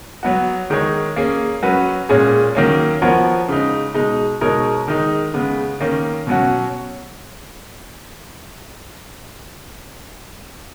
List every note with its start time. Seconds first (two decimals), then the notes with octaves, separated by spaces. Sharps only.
0.23 F#3 B3 F#4
0.70 D#3 G#3 D#4 G#4 C#5
1.16 A#3 C#4 G#4
1.62 F#3 C#4 F#4 B4
2.09 A#2 G#3 C#4 G#4 C#5
2.55 D#3 F#3 A#3 C#4
3.02 F3 B3 F#4 A#4 C#5
3.48 C#3 G#3 D#4
3.94 B2 G#3 D#4
4.41 B2 G#3 D#4 A#4 C#5
4.88 D#3 G#3 D#4
5.34 C#3 G#3 B3
5.80 D#3 A#3 C#4
6.27 B2 F#3 C#4 F#4